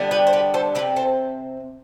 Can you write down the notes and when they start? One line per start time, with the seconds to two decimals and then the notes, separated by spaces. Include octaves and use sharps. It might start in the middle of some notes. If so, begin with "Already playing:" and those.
Already playing: D3 G3 B3 D4
0.11 G4 B4
0.27 C5
0.33 G4 B4
0.54 A4 C5
0.75 C3 G3 C4 G4 B4
0.96 A4 C5